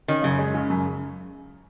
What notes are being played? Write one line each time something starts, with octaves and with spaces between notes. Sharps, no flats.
D#3 C#4
F#2 C#3
G#3
C#3
F#2